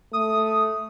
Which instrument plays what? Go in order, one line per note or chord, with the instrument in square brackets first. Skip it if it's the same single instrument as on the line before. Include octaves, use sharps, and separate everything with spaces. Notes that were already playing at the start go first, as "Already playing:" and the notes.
[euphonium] A3 [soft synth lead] D#6